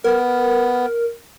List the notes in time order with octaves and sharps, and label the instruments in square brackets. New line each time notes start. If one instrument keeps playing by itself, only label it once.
[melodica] B3 [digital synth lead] A#4